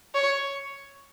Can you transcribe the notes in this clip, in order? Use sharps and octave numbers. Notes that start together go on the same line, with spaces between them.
C#5